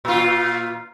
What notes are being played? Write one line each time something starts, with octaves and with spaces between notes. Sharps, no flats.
A#2 F4